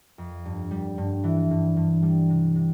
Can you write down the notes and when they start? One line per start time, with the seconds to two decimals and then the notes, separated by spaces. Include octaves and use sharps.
0.18 F2
0.45 G2
0.71 G3
0.98 G2
1.24 E3
1.50 G2
1.76 G2
2.02 G3
2.29 C3
2.55 C3